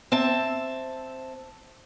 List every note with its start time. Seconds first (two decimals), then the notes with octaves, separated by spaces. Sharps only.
0.12 C4 E5 A5